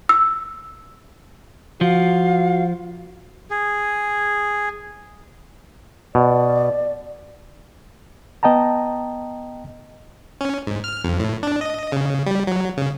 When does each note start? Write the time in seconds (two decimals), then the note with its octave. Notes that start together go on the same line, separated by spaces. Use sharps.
0.09 E6
1.81 F3 F#4 F5
3.50 G#4
6.15 B2 D5
8.43 B3 D#5 G5 A5 A#5
10.41 C#4
10.67 G#2
10.84 F6
11.04 F2
11.20 A2
11.43 D4
11.61 D#5
11.92 C#3
12.26 G3
12.47 F#3
12.77 C#3